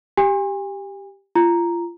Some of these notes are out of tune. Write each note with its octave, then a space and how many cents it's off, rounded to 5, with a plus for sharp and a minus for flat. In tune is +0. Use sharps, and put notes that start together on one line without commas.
G4 +0 G#5 -40
F4 -30 A#5 +0